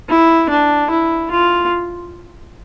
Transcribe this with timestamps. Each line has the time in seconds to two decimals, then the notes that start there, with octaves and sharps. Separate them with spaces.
0.09 E4
0.49 D4
0.90 E4
1.31 F4